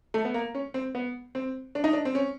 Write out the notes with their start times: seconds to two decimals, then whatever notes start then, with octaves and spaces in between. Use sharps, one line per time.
0.14 A3
0.25 B3
0.34 A#3
0.55 C#4
0.74 C4
0.95 B3
1.35 C4
1.75 D4
1.84 D#4
1.93 D4
2.05 C4
2.15 C#4